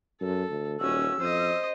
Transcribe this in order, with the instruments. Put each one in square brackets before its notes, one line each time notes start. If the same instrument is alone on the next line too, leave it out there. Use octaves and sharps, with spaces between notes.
[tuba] F#2 [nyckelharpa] A4
[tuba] D2
[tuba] D#1 [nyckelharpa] C#4 F#4 [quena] E6
[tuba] F2 [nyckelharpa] C5 D#5